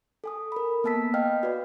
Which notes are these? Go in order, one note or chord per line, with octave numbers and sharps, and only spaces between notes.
A4 G#5 D#6
A#4 B5
A#3 B3 A5 E6 B6
D#5 F5 G5 F6
F#4 B4 D5